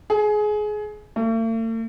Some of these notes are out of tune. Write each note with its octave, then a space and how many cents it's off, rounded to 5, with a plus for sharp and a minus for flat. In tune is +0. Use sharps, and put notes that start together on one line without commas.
G#4 +20
A3 +45